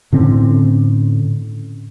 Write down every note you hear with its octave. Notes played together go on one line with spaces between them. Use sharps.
A2 D3 C4 C#4